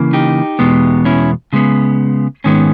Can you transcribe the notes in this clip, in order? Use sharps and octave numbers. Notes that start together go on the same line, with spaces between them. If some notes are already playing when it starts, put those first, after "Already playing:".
Already playing: C#3 E3 A#3
D#4 G4
E2 B2 G#3 B3
C#4 E4
C#3 G#3 B3
G#2 D#3 G#3 B3 C#4